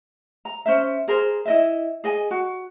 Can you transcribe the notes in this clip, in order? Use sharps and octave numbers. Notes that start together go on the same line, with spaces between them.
A#5
C#4 C5 E5
G#4 A#4 C5
E4 D#5 E5
G#4 D#5 G#5
F#4